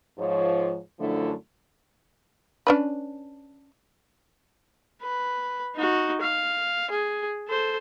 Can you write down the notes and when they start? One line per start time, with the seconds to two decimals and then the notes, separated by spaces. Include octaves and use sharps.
0.19 G#2 F3 C#5
1.00 F#2 D3 F3 A3 D4 E4
2.67 C#4 D4 B4
5.03 B4
5.76 D#4 F#4
6.21 F5
6.90 G#4
7.48 A4 C5